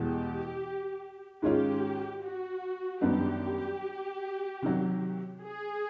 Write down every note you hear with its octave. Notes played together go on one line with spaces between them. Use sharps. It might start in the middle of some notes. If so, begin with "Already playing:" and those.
Already playing: E2 B2 G#3 G4
G#2 D#3 G#3 C#4 F4 G4
F#4
F#2 D#3 G3 B3 D4 G4
C3 D#3 F#3
G#4